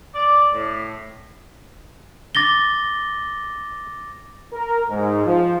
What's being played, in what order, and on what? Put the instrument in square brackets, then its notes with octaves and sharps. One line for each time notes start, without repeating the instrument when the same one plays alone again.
[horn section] D5
A2
[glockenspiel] D6 A6 A#6 G7
[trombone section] A#4
G#2
F3